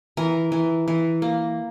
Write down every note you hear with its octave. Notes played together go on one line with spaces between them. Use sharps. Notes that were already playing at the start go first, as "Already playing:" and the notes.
E3 A#4
E3
E3
A#3